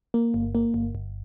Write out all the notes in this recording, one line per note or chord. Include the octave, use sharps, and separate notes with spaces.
A#3
G1
A#3
G1
G1